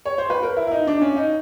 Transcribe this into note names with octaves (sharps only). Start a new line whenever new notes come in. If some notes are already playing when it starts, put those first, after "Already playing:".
C#5
C5
B4
A#4
E4
E4
D#4
D4
C#4
D#4